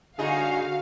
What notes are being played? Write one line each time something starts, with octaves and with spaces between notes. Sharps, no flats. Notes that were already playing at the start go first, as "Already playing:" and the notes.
G2 D3 D#4 F#4 G#4 F5